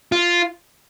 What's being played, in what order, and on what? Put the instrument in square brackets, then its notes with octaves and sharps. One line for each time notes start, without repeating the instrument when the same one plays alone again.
[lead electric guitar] F4